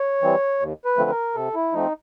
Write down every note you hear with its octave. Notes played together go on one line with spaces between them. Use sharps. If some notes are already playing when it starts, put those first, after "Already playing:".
Already playing: C#5
E3 G3 C4
D#2
B4
D3 F3 A3 C4
A#4
C3 A4
E4
F3 A3 C4 D#4